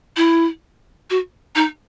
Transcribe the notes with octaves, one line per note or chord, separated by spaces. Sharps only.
E4
F#4
D#4